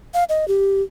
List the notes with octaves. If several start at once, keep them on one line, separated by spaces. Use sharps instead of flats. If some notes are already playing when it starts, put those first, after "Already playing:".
F5
D#5
G4